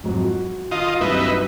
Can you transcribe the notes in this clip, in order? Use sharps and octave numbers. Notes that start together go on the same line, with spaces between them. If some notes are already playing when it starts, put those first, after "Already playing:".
F2 G#2 F#3
F#4
D#3 F4 D#5
C2 G2 F#3 D#4 B4 E5